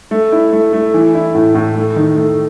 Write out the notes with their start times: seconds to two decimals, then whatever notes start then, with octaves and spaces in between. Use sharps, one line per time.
0.11 A3
0.32 E4
0.53 A3
0.73 A3
0.94 E3
1.14 E4
1.35 A2
1.55 A2
1.76 A3
1.96 D#3
2.17 A3